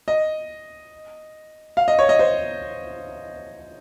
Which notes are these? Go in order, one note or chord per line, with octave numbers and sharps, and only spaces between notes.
D#5
F5
D#5
C#5
D#5
C5